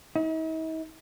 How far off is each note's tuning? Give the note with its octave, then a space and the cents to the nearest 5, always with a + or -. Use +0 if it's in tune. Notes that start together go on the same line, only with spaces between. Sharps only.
D#4 +45